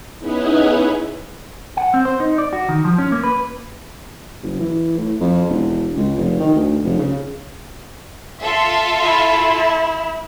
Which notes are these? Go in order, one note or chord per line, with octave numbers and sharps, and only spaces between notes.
B3 C#4 D#4 E4 G#4 B4
F#5
C4
C5
D#4
D5
F#4
D#3
F3
C#4
A#3
B4
F#1
E3
A2
F2
E1
C#2
F1
D#3
D2
F1
C#3
F4 A4 E5
E4